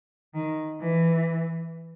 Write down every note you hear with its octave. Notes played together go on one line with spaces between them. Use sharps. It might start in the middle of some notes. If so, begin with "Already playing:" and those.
D#3
E3